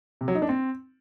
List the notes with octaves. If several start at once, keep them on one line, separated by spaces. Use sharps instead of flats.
C3
F#3
D#4
D4
C4